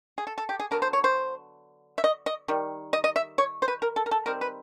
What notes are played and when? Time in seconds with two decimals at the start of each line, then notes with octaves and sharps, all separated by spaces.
0.18 G#4
0.27 A4
0.38 A4
0.49 G4
0.60 G#4
0.71 D3 F#3 B3 A#4
0.82 C5
0.93 C#5
1.04 C5
1.98 E5
2.04 D#5
2.26 D#5
2.48 D#3 G3
2.93 D#5
3.04 D#5
3.16 E5
3.38 C#5
3.62 C5
3.68 B4
3.82 A#4
3.96 A4
4.06 A#4
4.11 A4
4.26 D#3 G3 C4 A#4
4.41 B4